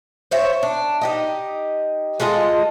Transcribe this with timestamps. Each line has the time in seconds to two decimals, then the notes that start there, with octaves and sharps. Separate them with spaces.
0.31 C5 C#5 E5
0.63 D4
1.01 D#4 G4 D#5
2.20 G#3 F4 A4 D#5